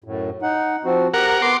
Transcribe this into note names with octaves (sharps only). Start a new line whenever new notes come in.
F#2 A2
D#4 F#5
F3 C4 F#4
G4 A#4 F#5
B3 C6 D6